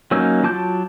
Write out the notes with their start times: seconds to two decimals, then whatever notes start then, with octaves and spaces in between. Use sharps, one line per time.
0.11 F#3 A#3 C#4 D#4 E6
0.43 F#3 F4 A5 D6 G6